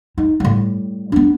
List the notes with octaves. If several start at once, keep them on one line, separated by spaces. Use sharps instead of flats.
D#4
A2 G3
B3 D4